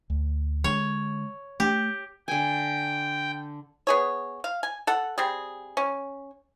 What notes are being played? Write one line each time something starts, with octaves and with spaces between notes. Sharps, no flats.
D2
D3 G#3 C#5
A3 G4
D3 G5 G#5
B3 G#4 C#5
F5
G#5
A4 F#5
G3 C4 G#4
C#4